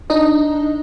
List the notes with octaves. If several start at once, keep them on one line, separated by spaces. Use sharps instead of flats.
D4 D#4 D#5